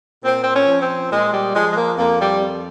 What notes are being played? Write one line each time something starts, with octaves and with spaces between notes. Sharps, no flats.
A#2 C4
C4
C#4
F3
C4
A#2 G#3
G3
F3 G#3
G#3
A#3
F2 A#3
G3
F2